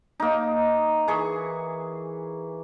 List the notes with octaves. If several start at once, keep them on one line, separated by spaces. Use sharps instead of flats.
A#3 D#4
E3 G#4 C#6